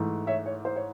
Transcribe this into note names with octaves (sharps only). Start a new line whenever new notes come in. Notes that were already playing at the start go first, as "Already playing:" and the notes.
Already playing: G#2 E3 A3
C#5 E5
C#5
C5
C#5